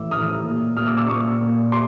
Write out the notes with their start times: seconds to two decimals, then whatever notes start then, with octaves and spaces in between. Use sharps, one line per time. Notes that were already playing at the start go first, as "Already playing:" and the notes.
Already playing: A2 E3 D6 E6
0.11 A2 E3 D#6 F6
0.44 A#2
0.76 A#2 D#6 F6
0.87 D6 E6
0.97 D6 E6
1.08 A#2 C#6 D#6
1.41 A#2
1.72 C6 D6